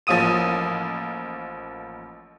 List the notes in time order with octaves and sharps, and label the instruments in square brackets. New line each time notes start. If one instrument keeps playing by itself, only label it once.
[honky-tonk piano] A1 F3 A#3 D#6 D#7